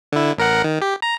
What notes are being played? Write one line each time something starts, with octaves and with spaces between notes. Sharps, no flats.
D3 E4
A1 A#4 F#5
D#3
G4
A#5